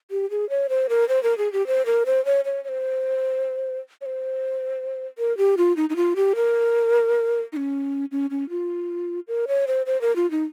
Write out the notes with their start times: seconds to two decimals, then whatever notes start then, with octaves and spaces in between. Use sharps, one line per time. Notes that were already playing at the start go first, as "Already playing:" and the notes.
0.11 G4
0.30 G#4
0.50 C#5
0.69 C5
0.89 A#4
1.09 C5
1.23 A#4
1.38 G#4
1.53 G4
1.67 C5
1.86 A#4
2.06 C5
2.25 C#5
2.45 C#5
2.64 C#5
2.69 C5
4.01 C#5
4.06 C5
5.18 A#4
5.38 G4
5.57 F4
5.77 D#4
5.90 D#4
5.96 F4
6.16 G4
6.35 A#4
7.53 D#4
7.57 C#4
8.12 C#4
8.30 C#4
8.50 F4
9.28 A#4
9.48 C#5
9.67 C5
9.86 C5
10.01 A#4
10.16 F4
10.31 D#4